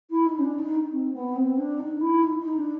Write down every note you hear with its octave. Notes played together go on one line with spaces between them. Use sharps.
E4
D#4
C#4
D4
D#4
C4
B3
C4
D4
D#4
E4
D#4
D#4
D4